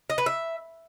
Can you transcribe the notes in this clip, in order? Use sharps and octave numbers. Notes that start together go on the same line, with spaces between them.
D#5
B4
E5